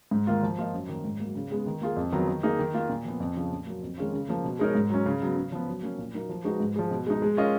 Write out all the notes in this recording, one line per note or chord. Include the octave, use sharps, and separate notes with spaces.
G#2
D#3 A#3 F4
F3
A#3 F4 A#4 D#5
F#2
D#3 A#3
G#2
F#3 A#3
C#3
G#3 B3
D#3
A#3 F4 G#4
F2
D#3 F#3 B3 F4
D#3
A#3 D#4 G#4
D#3
A#3 F4
A#2
F3 B3
F2
C#3 F3
A#2
F#3 A#3
F2
D#3 G#3 C#4 F4
C#3
F3 A#3
B2
G#3 D#4 A#4 C#5
G#2
F#3 C#4
C#3
F#3 B3
C#3
F3 B3
F#3
A#3 C#4
A#2
F#3 A#3 D#4 A#4
F3
G#3 D#4 F#4 B4
G#2
F3 G#3
B2
G#3 D#4
G#3
C#4 F4 A#4 D#5